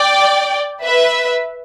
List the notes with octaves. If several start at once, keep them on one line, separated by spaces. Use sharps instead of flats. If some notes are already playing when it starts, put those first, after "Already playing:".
Already playing: D5 G5
B4 E5